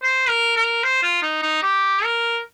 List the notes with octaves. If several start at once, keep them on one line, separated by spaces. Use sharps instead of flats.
C5
A#4
A#4
C5
F4
D#4
D#4
G4
A#4